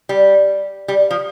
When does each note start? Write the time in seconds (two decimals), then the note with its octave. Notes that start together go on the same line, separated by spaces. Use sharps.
0.09 G3
0.88 G3
1.11 F3